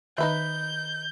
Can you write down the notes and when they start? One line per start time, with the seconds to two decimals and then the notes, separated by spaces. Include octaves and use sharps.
0.18 D#3 D#4 B4 E5 G6